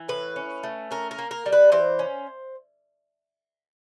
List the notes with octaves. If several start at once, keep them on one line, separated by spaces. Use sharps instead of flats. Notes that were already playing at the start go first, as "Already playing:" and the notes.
Already playing: E3
A2 B4
C#4
A3
C#4 A#4
A#4
A#3
A#4
G3
B4
E3 C5
C#4